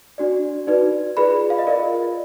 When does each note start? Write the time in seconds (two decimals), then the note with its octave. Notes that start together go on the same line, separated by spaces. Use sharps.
0.18 D4 F#4 D5
0.67 D#4 F#4 B4 D5
1.17 F4 G#4 B4 D5 B5
1.50 F5
1.58 D#5
1.67 F4 A#4 D5